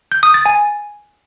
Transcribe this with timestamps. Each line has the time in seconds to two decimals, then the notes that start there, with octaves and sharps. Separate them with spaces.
0.12 G6
0.23 D#6
0.34 A6
0.46 G#5